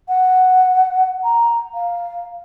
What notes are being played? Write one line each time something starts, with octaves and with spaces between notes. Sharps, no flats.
F#5
A#5
F5